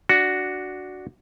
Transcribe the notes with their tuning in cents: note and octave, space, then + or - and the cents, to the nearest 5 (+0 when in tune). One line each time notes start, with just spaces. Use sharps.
D4 +0 F#4 +0